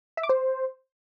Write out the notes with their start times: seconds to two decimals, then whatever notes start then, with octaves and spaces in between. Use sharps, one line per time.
0.17 E5
0.23 D6
0.29 C5